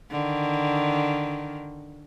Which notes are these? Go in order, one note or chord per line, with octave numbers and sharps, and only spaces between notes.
D3 D#3